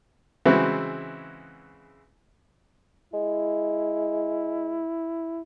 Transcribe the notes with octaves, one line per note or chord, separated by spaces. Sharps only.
C#3 E3 G#3 C4 E4 F#4
G#3 E4